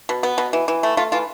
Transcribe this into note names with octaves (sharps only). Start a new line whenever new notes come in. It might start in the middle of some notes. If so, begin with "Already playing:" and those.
B2
B3
B2
E3
E3
A3
A3 F4
E3 F4